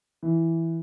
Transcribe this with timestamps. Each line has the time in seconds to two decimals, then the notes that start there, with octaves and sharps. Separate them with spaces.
0.23 E3